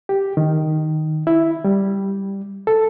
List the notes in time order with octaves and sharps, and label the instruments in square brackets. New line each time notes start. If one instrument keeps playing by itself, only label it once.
[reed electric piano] G4
D#3
E4
G3
A4